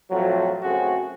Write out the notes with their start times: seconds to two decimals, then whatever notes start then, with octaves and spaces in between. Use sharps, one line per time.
0.10 F2 A2 F3 F#3
0.63 F#2 C#3 A3 C4 F#4 G#4